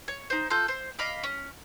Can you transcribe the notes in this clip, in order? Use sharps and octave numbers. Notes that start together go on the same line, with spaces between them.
C#5
D#4 C5
F4 A4 G6
C5
D#5 F5 B5 D6
C#4